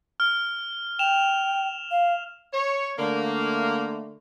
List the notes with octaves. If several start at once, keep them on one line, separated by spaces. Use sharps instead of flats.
F6
G5 E7 F7
F5
C#5
D3 A3 A#3